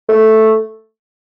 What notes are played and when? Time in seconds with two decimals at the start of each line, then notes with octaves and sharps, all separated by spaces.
0.09 A3